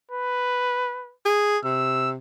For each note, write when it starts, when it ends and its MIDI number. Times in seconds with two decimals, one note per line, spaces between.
0.11 1.14 71
1.25 1.58 68
1.65 2.17 48
1.65 2.10 88